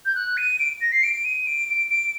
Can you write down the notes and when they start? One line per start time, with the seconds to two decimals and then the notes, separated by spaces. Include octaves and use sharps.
0.05 G6
0.15 F#6
0.37 D#7
0.60 D7
0.81 A#6
0.92 C7
1.03 D7
1.25 D#7
1.47 D7
1.68 D7
1.90 D7